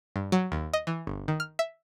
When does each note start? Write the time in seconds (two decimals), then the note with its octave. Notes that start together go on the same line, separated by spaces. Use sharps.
0.16 G2
0.32 F#3
0.52 D#2
0.74 D#5
0.87 E3
1.07 G1
1.28 D#3
1.40 F6
1.59 E5